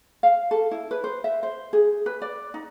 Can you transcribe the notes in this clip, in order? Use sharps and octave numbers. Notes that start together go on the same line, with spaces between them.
F5
A4
E4
B4
C5
E5
C5
G#4
B4
D5
D#4